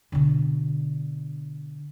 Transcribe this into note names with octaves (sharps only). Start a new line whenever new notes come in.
B2 D3